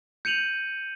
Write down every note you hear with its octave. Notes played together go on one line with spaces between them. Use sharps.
G6 C#7 D#7 F7 F#7